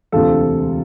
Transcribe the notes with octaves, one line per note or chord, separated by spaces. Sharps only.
E1 D2 C3 F4 A4